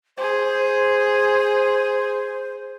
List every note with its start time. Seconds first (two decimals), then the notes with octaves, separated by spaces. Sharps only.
0.17 G#4 C5